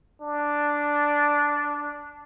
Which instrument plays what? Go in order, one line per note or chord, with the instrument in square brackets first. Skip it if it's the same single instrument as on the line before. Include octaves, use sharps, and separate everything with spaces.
[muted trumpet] D4